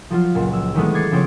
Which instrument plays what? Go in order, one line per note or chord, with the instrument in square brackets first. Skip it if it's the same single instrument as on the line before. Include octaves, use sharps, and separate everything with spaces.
[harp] F3 F#3 F4
C#2 A#2 F#3
E6
D#3 E3 F#3 G#3 A3 B3
D6 G#6 A6 C7 C#7
C#3 F3 B3 C4 C#5 D7